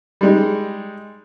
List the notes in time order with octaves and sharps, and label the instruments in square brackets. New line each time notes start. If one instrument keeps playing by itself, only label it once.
[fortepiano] G3 G#3 D#4